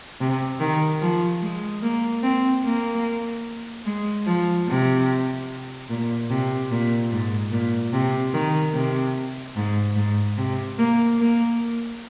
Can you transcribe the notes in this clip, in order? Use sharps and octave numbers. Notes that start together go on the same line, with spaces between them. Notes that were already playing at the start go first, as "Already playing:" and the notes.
C3
D#3
F3
G#3
A#3
C4
A#3
G#3
F3
C3
A#2
C3
A#2
G#2
A#2
C3
D#3
C3
G#2
G#2
C3
A#3
A#3